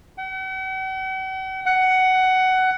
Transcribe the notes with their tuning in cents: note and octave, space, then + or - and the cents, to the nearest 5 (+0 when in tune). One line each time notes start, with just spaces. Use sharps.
F#5 +45
F#5 +15